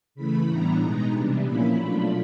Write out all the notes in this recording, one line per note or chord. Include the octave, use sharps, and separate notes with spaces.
C#3 E3 A3 B5
A2 E3 G3 B3 D4 A#5
B2 G#3 B3 D#4
C3 E3 G3 B3 D4
A#2 F3 A#3 C#4 E4 B5
B2 F#3 A3 D4 F4